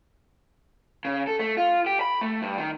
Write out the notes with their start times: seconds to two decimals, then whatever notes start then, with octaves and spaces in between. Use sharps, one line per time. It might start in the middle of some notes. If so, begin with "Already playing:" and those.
1.05 C#3
1.27 A4
1.39 A3
1.57 F4
1.86 G4
2.01 B5
2.21 A3
2.42 G2
2.58 D#3